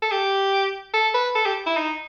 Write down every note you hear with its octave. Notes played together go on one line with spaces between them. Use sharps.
A4
G4
A4
B4
A4
G4
E4
D#4